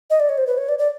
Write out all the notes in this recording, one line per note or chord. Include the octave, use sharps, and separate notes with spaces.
D#5
D5
C#5
C5
B4
C#5
D5
D5